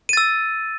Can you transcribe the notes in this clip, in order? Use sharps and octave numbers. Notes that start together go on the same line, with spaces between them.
E6 A6 D#7